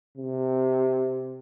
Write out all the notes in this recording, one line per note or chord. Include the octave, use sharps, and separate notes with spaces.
C3